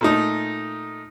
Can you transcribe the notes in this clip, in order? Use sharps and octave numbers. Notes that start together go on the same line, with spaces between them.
A#2 A3 D#4